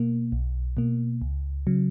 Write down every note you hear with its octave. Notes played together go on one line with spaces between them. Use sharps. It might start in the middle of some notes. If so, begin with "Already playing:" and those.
Already playing: B2 A#3
B1
B2 A#3
C#2
C#3 F#3